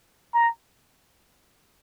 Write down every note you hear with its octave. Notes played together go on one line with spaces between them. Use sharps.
A#5